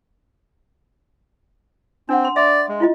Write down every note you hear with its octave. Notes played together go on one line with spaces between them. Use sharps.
C4 D4 F#5
C6
D5 E5 C6
G#3
E4 F4 D#5